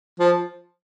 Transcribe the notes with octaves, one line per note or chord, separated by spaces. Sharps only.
F3